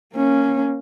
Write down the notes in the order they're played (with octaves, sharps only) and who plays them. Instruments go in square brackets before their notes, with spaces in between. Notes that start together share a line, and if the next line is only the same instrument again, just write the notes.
[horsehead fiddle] A#3 C#4